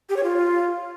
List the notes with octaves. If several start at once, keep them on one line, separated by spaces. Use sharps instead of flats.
G4
C#5
F4